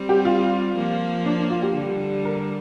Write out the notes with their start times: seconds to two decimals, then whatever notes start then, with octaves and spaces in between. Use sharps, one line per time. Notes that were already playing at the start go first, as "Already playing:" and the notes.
Already playing: G3 C4
0.09 G4
0.25 F4
0.76 F3 A#3
1.25 D4
1.38 D4
1.50 F4
1.63 G4
1.75 D3 G3
2.25 A#4